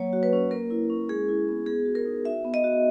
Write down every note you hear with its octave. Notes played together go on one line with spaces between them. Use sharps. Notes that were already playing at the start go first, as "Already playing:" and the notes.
Already playing: F#3 A#3 C#5
F#4
B4
C#4
A#3 A#4
E4
C#4
G#3 G#4
E4
B3
B3 G#4
F#4
A#4
D#4
F#4 E5
B3
D#5
F#4